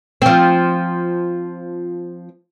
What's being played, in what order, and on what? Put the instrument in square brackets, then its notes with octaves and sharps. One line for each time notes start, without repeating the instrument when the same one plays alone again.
[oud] F3 C4